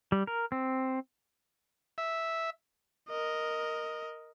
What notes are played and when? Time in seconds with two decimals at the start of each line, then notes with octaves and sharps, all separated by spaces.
0.12 G3
0.27 A#4
0.52 C4
1.98 E5
3.09 A#4 D#5